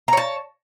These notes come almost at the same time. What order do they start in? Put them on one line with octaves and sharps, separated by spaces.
A#5 C#5 A5